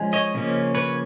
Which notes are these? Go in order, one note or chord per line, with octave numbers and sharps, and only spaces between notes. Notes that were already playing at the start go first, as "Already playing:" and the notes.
Already playing: F3 G#3 C#4
C#5 D#5
C#3 F3 A#3 C#4
B4 C#5